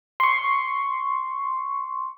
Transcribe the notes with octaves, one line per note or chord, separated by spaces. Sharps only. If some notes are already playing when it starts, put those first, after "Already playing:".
C6 C#6